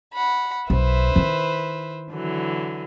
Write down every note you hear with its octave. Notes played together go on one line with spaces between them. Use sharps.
F#5 B5
B1 B4 C5 E5
D#3 E4
D3 E3 F#3